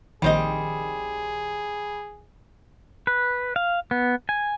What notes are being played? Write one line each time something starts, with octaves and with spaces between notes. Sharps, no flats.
A#1 D#3 G3 C4 G#4 D#5
B4
F5
B3
G#5